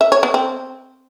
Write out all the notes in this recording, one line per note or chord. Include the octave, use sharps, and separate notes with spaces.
E5
C#5
B3
C4